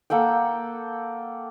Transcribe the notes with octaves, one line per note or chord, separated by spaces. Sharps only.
A#3 A4 F#5 G5